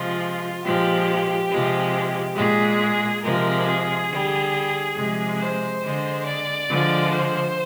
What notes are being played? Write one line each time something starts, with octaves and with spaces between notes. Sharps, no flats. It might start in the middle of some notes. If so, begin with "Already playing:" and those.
Already playing: C3 F3 G#3 F4
A#2 F3 G#3 G4
C3 F3 G#3
A#2 G#3 G#4
C3 F3 G#3 A#4
G#4
D3 G3
C3 F3 G#3
C5
D3 G#3
D5
D3 F3 G#3
C5